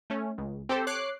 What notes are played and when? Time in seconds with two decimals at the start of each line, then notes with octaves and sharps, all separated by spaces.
0.10 A3 C#4
0.38 C#2
0.69 C4 G4 A4 C5
0.87 C#5 D6 F#6 C7